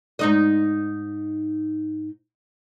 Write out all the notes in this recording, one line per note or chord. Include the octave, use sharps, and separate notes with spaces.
G#2 D#4 D#5